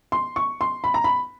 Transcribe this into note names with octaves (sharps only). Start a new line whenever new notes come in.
C6
C#6
C6
B5
A#5
B5